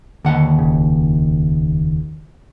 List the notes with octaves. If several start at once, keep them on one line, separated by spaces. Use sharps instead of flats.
D#2 D3 F#5
F1 C#3